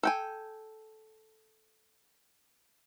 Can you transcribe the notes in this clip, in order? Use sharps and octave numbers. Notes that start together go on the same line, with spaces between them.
A4 G5 G#5